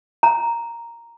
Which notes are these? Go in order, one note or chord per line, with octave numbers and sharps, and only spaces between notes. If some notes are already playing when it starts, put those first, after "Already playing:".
A#5